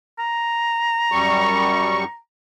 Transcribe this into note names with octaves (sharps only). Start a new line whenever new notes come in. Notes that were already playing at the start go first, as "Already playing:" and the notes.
A#5
F#2 G3 C#6